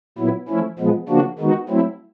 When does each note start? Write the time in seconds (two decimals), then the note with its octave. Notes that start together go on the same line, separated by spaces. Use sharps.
0.18 A#2 F#3 B3 E4
0.48 F3 A3 C#4 E4
0.79 A#2 F3 G#3 B3
1.09 C#3 F3 A#3 D4 F#4
1.39 D#3 G#3 B3 D#4 F#4
1.69 F#3 A3 C4 E4